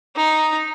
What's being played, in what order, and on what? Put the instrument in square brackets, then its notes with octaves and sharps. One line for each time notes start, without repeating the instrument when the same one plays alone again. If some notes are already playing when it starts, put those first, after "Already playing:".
[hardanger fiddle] D#4